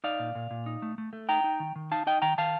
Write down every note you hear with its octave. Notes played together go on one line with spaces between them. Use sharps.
D#4 D5 F5
A#2
A#2
A#2
D#4
A3
A3
A3
D#4 G5 A#5
D#4
D#3
D#3
D#4 F5 A5
D#4 D#5 G5
D#3 G5 A#5
D#3 F5 A5